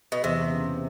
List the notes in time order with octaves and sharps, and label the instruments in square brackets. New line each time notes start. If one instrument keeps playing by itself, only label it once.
[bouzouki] B2
[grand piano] E2 [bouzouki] C3
[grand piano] C#3